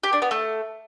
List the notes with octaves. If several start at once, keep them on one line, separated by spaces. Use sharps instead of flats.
G4
D4
B3
A3